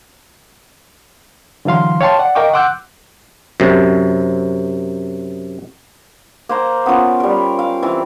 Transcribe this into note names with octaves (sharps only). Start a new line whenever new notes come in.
D3 E3 F#3 F5 C6
C#5 F5 G5 A5 C6
D5 F#5
A#4 D#5 F5 G5 C#6 D6
F#5 C6 D6 E6 F#6 G6
F#2 C3
A#3 C5 A#5
B3 C#4 F4 A#4
G3 A#4
F5
E3 C4